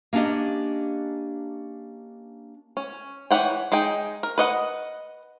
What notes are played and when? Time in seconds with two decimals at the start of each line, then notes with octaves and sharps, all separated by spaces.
0.13 A#3 C#4 D4 G4 D#5
2.77 C#4
3.31 E3 C#5 F#5 G5
3.72 G#3 D#4 G#4 G5
4.23 A#4
4.38 B4 D#5 F#5